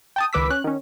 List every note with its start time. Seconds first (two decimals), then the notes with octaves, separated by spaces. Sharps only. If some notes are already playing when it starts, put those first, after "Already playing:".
0.16 G5 A5 D#6
0.33 C#2 D#3 B4 D6 E6 B6
0.50 C#4 F#6
0.64 D#3 C#4